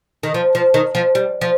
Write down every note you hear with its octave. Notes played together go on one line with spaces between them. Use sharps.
D#3
F3
F3
D#3
F3
G3
F3